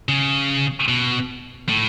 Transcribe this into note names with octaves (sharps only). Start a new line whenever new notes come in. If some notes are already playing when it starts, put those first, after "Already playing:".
C#3
B2
A2